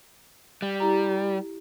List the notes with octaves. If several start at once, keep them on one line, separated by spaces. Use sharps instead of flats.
G3
E4 G4 A#5